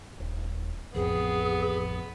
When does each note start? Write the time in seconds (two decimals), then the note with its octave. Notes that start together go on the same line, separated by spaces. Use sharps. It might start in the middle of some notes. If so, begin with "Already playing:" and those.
0.20 D#1
0.95 A1 F2 C3 B3 G#4